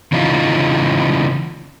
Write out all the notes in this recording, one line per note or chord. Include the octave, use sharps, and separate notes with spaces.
C#3 E3 D#4 F4